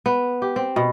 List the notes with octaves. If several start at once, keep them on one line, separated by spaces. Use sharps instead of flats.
B3
G4
C4
B2